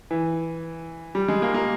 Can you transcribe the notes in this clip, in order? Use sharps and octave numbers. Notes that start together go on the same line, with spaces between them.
E3
G3
G#3
A#3
A#3